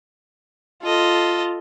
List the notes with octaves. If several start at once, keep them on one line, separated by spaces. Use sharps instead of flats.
F4 A4 D#5